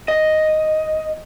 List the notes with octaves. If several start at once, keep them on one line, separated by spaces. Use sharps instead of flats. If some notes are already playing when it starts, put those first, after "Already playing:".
D#5